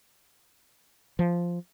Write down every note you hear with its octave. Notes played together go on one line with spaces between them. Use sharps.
F3